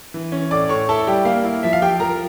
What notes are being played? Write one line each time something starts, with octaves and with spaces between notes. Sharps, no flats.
E3
C#4
A2 D5 D6
A2 C#5 C#6
E4 A4 A5
G3 G4 G5
A#3 F5
E4
F3 E5
F5
F3 G4 G5
F3 A#4 A#5